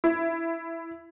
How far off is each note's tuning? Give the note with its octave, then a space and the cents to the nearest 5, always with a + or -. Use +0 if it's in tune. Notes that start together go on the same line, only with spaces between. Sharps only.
E4 +15